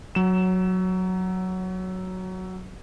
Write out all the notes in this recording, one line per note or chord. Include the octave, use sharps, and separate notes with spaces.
F#3 E7